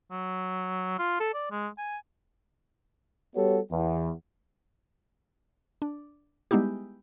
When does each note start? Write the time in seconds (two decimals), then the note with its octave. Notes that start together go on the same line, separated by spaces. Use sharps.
0.11 F#3
0.99 F4
1.20 A4
1.34 D5
1.51 G#3
1.78 G#5
3.35 G3 B3 F#4 G4 A4 C#5
3.71 E2
5.82 D4
6.51 G3 G#3 B3 D#4 E4 G4